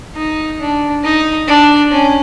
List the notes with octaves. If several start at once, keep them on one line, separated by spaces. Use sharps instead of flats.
D#4
D4
D#4
D4
C#4